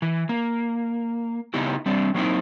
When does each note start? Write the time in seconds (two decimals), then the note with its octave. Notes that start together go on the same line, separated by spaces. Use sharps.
0.02 E3
0.29 A#3
1.54 C#3 B3 D#4 E4 G4
1.86 G3 C4 D4
2.14 F#3 A#3 C4 D#4 E4